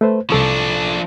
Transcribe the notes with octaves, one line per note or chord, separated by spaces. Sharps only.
A3 B4 C5
C2 F3 D4 A4 C#6